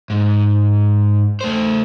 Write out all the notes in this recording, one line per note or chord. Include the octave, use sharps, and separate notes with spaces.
G#2
A3 C5